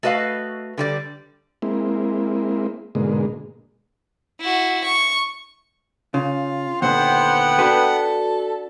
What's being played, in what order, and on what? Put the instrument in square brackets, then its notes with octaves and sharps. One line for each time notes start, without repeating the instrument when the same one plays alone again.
[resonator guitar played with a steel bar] A3 F#4 B4 D#5 F5
D3 G3 D5
[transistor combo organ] G#3 A#3 C4 E4
G#2 B2 D3 G#3 A#3
[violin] E4 F#4
C#6
[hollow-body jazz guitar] C#3 [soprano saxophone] F4
[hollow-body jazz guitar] D#2 A#2 D3 [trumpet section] B3 G5 [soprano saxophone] C5 [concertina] F#5
[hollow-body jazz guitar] D4 F#4 B4 [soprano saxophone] A4